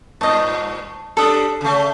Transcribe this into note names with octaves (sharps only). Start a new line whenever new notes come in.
G2 A#2 D#5 A5
G3 D4 A4 D#6
C#3 A3